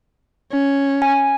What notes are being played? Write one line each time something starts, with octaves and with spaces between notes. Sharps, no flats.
C#4
G#5